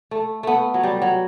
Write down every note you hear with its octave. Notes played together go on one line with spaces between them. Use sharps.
A3
A3 B3
F#3
G3
F#3